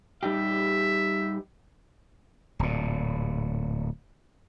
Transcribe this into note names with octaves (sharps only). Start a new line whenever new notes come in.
G3 D#4 G4 E5
D1 A#2